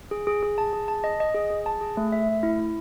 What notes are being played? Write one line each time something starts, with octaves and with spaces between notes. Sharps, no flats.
G#4
G#4
G#4
A5
G#4
A5
D#5
D#5
G#4
G#4
A5
G#4
A3
E5
A3
E4
E4